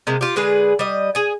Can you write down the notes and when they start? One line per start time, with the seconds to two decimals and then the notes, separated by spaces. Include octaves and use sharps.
0.07 C3 G#3 A#3
0.21 F4 G4
0.36 D3 G#3 G#4 B4
0.79 G3 D#5
1.15 G#4 G#5